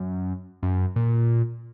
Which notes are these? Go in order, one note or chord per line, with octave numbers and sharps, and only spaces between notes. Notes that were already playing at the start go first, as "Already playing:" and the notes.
Already playing: F#2
F#2
A#2